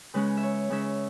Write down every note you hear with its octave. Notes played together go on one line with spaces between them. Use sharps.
C#3 G#3 C#4 B4
E5
C#5
C#3 G#3 C#4 E5